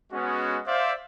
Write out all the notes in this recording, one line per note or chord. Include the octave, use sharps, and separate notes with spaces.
G#3 B3 C#4 F#4
C5 D5 E5 F5